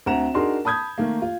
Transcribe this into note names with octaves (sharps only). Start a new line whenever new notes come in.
D2 C4 F#5 A#5 E7
D4 D#4 F#4 G#4 A#4 C6
A5 B5 D#6 G6 G#6
D#3 A3 A#3
F4